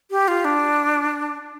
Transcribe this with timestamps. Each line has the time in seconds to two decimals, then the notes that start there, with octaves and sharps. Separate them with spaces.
0.11 G4
0.28 F4
0.45 D4